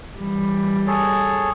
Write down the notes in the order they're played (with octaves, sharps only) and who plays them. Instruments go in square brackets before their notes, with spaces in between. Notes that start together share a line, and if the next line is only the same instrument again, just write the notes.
[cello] E3 G3
[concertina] G#4 A4 C#5